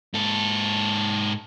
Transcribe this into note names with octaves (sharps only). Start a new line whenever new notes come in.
G#2 A4